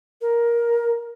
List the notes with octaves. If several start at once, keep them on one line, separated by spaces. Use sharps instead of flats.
A#4